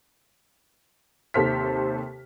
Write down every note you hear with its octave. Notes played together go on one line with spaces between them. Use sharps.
D#2 C3 A4 C5 F6 B6